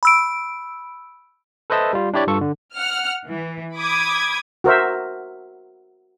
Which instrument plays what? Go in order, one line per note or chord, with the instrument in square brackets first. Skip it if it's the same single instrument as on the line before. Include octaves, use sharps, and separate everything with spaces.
[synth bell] B5 E6 D7
[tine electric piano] A4 B4 C5 D#5 E5 A5
G3 F4
D4 E4 G4 C#5 D5
G2 F4 A4 C#6
D3
[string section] F#5 F6
E3
B5 D6 D#6 G#6
[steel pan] F#4 A#4 C5 E5